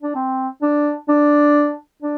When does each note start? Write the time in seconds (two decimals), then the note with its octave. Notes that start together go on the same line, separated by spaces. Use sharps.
0.02 D4
0.15 C4
0.62 D4
1.09 D4
2.02 D4